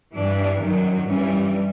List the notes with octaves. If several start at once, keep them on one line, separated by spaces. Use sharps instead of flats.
G2 E3 G3 D4
F#2 D#3 F#3
G2 E3 G3 C#4